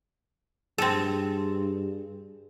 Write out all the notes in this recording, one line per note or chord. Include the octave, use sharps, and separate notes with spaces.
G2 C4 G#4 A4